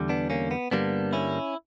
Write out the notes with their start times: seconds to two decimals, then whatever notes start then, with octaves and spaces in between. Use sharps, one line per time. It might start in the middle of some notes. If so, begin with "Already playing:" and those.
Already playing: E2 D3 G3
0.09 B3 D4
0.30 A#3 C#4
0.51 B3
0.71 G2 D3 G3 A#3 B3 D4
1.13 C#4 E4